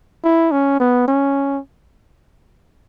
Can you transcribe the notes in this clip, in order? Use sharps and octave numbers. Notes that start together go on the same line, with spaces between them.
E4
C#4
B3
C#4